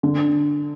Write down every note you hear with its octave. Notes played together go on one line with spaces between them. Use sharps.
D3